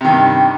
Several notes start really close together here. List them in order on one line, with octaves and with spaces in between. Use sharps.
C3 D#3 G2